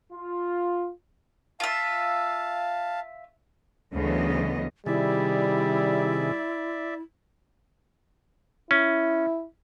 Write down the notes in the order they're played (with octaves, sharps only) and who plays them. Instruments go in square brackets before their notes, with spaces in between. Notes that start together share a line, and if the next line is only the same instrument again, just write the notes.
[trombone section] F4
[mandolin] F4 E5 [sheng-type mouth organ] F5 A5
[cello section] D2 C#3 E3 F#3 B3 D#5
[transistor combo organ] C3 D#3 G#4 [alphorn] G3 [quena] E4 [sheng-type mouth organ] D5 E5
[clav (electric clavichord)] C#4 [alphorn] E4